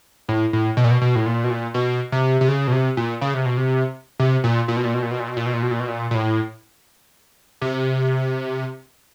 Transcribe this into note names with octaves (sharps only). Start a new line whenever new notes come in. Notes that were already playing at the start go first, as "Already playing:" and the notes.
A2
A2
B2
A#2
B2
B2
A2
A#2
B2
A#2
B2
C3
C3
C#3
B2
C3
A#2
C#3
C3
B2
C3
C3
A#2
A#2
B2
A#2
B2
A#2
B2
A#2
B2
A#2
B2
A#2
B2
A#2
B2
A#2
A#2
A2
C3